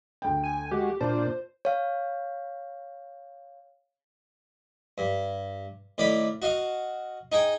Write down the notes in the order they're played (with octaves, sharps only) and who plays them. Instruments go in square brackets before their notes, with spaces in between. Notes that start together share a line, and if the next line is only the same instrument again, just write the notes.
[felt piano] D2 G5
[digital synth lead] G#5
[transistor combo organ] G#3 F#4 [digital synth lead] G4
[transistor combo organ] A#2 D4 [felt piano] F4 A5 [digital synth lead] C5
[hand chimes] C#5 F5
[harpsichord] G2
A2 D#3 D5 B5
F#4 D#5 F5
D#4 G#4 G5